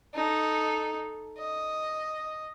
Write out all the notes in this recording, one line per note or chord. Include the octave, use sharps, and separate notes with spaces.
D#4 A4
D#5